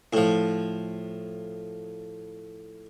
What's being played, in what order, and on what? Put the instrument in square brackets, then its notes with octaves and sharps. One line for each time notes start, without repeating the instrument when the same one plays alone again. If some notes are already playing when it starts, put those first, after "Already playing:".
[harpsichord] A2 F3